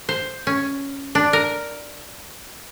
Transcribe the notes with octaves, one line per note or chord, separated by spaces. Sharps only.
C5
C#4
D4
A#4